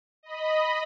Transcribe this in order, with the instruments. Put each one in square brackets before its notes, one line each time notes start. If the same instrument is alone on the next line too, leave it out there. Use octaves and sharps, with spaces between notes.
[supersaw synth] D#5 B5